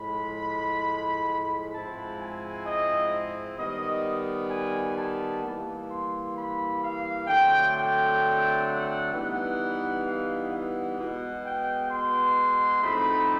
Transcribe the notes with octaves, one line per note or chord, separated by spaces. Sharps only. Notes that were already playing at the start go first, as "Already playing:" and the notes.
Already playing: A2 F3 G#3 B5
G#2 F3 G#3 C4 E4 A5
G#5
D#5
D#3 G3 B3 D#5
G#5
A5
E3 G3 A#3
C6
B5
F5
D3 F#3 A3 C4 G5
G5
F#5
E3 G3 B3 D#4 F#5
F5
F#5
B2 G#3 B3
G5
C6
A2 F3 A3 C4 D#4 B5